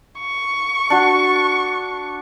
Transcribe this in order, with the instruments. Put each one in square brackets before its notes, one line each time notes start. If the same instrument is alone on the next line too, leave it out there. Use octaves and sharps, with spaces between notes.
[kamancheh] C#6
[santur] D4 F#4